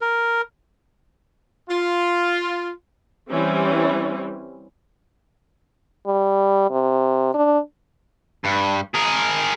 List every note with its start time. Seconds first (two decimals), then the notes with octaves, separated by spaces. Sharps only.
0.01 A#4
1.70 F4
3.31 E3 G3 C4 C#4
6.07 G3
6.71 C3
7.34 D4
8.45 G2
8.95 G#4 A#4